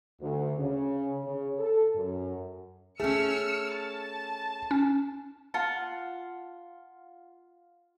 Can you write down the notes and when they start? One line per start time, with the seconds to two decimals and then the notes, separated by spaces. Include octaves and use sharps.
0.21 D2
0.57 C#3
1.24 C#3
1.59 A4
1.95 F#2
3.00 A3 C#4 G#4 E6 F6 C#7
3.72 A5
4.71 C#4
5.54 F4 F#5 A5